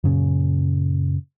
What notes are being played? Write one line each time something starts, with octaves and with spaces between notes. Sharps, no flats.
F#2 A#2 C#3 C#4